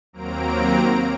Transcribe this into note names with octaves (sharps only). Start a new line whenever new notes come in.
D#2 F#3 A#3 C4 A#5 D7